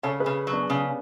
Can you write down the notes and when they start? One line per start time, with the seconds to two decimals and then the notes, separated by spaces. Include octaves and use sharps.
0.03 C#3 A4 C#5
0.20 G#4 B4
0.26 C#3
0.47 F#3
0.53 B3 D4
0.69 C#3 C#4